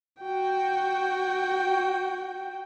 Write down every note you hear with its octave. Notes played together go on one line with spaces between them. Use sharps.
F#4 G5